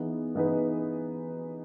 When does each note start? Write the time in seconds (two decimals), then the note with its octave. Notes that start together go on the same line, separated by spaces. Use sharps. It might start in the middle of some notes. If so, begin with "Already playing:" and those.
Already playing: E3 B3 D#4 G#4
0.35 E3 B3 D#4 G#4 B4